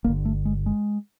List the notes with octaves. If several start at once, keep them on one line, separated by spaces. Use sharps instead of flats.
G1 G2 D3 A#3
A3
G#3
G#3